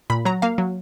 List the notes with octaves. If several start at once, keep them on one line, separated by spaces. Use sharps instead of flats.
A#2 B5
F#3 A#5
A#3 F5
F#3